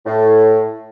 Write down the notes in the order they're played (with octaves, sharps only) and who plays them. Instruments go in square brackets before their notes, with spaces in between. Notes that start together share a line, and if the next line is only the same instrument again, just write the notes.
[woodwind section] A2